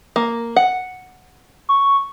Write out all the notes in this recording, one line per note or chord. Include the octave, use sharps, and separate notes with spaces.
A#3
F#5
C#6